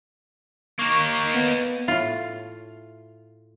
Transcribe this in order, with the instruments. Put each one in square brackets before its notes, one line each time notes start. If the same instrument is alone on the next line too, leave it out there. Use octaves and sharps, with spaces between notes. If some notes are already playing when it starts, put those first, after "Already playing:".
[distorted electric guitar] A#3 D#4 [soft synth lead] C#6
[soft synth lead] B3
[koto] A2 F4